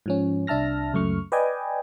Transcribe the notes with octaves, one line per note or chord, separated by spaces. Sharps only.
G#2 F3 C#4
C2 D4 E5 A5 F6 A#6
C#2 F#2 A3 C#6 F6
B4 D5 D#5 G5 G#5